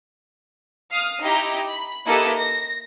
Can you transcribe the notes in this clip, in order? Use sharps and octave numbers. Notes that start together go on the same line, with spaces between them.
F5 D#6 F6
D#4 E4 G4 A#5
B5
A#3 D#4 E4 G4 A4 B4
A#6